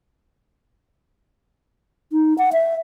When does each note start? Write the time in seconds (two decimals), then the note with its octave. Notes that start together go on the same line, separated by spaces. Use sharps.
2.12 D#4
2.38 F#5
2.53 E5